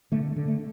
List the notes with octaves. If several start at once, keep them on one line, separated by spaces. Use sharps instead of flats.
D3 A3
D3
A3